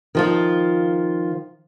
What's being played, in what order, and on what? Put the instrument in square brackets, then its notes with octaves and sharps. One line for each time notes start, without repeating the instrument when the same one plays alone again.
[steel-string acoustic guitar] D#3 F3 F4